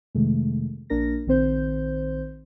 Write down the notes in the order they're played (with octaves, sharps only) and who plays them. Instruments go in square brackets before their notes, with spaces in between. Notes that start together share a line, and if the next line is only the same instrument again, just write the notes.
[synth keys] F2 C3 D#3 G#3 A3
A#1 A#3 D4 A#4 A#6
A#1 D#3 C4 C5 G6